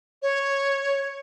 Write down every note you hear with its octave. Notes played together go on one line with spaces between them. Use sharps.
C#5